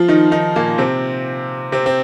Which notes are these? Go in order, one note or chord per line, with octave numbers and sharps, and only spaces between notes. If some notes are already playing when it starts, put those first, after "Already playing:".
Already playing: F3 F4
D#3 D#4
D#3 D#4
A#2 A#3
C3 C4
C3 C4
C4